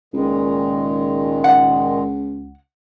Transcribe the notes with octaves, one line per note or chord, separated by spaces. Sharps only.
C#2 A#2 D#3 G#3
F#5